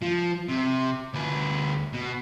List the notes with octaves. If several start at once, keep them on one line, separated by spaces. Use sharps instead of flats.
F3
C3
D2 B4
B2